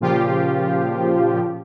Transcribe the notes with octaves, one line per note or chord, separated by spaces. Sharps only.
A#2 C#3 F3 F4 G4